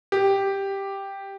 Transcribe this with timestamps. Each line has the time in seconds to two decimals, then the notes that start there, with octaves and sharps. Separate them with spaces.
0.12 G4